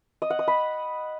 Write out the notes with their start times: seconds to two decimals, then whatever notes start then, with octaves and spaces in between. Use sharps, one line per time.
0.22 D#5
0.30 F#5
0.39 D#6
0.48 B5